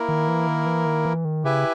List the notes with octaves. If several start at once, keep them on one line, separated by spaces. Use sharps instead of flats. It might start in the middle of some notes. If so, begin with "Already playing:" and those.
Already playing: A#3 E4 A#4
D#3
E3
D#3
E3
D#3
E3
D#3
C#3 E4 G4 B4 E5 G#5